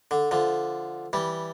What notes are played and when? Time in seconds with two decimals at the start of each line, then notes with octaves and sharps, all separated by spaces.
0.11 D3
0.31 D3 F3
1.13 E3 G3